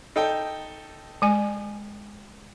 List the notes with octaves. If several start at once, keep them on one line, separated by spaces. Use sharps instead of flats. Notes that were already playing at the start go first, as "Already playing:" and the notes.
D#4 A4 G5
G#3 G#5